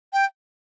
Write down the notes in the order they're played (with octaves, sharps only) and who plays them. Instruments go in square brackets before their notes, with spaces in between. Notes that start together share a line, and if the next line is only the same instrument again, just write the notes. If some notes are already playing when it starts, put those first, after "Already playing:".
[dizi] G5